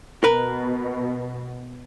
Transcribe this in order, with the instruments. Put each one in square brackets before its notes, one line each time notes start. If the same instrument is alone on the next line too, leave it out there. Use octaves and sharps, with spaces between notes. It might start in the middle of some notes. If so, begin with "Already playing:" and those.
[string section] B2 [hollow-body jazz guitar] A#4 B4